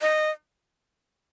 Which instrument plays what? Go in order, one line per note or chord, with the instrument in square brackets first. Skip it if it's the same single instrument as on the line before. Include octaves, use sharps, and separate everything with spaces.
[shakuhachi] D#5